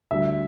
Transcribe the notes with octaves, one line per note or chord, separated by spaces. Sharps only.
D2 D3 G3 E5